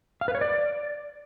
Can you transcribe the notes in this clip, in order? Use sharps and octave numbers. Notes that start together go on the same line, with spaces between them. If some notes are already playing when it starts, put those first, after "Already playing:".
F5
B4
C#5
D5